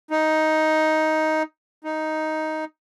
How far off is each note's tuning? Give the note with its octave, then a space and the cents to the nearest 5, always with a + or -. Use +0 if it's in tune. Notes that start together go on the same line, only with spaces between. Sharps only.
D#4 +10
D#4 +5